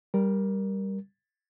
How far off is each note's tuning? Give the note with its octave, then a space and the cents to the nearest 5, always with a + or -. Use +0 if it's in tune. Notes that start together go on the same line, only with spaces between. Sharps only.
G3 +0 A#4 +10